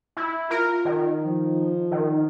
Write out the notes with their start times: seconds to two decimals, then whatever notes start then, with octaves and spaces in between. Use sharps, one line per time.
0.17 E4
0.51 F4 A#4
0.85 D#3
1.24 F3
1.91 D#3